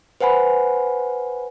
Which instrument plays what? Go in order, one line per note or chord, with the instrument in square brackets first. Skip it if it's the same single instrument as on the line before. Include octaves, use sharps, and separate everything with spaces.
[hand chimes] B4 C5 F#5 G#5 B5